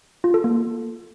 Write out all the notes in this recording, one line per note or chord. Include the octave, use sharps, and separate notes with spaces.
F4
A4
A#3